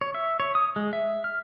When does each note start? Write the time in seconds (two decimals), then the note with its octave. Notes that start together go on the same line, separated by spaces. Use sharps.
0.01 C#5
0.15 E5
0.40 C#5
0.55 D#6
0.76 G#3
0.93 E5
1.24 F6